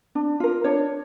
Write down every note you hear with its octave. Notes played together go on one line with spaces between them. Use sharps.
D4
F4 A#4
D4 C#5